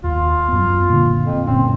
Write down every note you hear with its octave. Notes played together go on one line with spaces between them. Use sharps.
D#2 F4
F#2 B3
A#2 D3
F2
F#1 A#2 C4 C#4